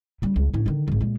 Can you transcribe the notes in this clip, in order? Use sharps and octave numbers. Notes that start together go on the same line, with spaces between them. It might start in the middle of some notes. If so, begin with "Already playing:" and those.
G3 C#4
C#2 G#3
A2 C#4
D3 D#3
D#1 G#1
A#2 G#3